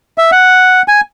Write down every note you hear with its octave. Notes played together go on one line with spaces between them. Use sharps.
E5
F#5
G#5